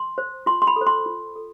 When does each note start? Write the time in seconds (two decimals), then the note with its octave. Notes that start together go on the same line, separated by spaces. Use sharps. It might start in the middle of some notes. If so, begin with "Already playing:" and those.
Already playing: C6
0.18 C5
0.46 F4 C6
0.62 C6
0.67 B5
0.76 A4 C5
0.87 C6
1.06 F4
1.36 A4